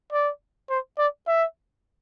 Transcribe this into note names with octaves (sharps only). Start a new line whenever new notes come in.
D5
C5
D5
E5